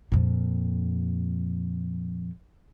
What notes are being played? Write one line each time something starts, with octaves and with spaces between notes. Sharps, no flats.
F2 A#2